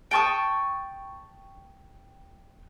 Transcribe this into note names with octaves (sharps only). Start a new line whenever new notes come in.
G5 A5 C#6 D#6